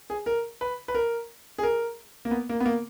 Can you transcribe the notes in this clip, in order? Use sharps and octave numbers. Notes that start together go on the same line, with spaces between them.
G#4
A#4
B4
B4
A#4
G#4
A#4
A#3
B3
A#3
B3
A#3